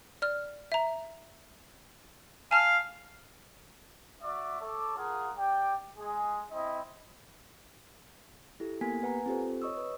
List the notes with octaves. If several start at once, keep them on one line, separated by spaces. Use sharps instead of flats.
D5 F6
E5 A#5
F5 G#5 A5 F6
F#4 D5 E5
A4 C#5 A5 D6
F4 G#4 A#4 F5 F#5
G4 D5 G5
G#3 G#4
C4 E4 D#5
E4 G4 A4
A#3 B3 G4 A#4 G#5 B6
B4 F#5 G#5 A#5
C4 F4 G4 A4 C5
C#5 D#5 C#6 D#6 E6
B4